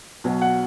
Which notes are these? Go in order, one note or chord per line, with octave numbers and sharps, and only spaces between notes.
B1 B2 F#3
F#5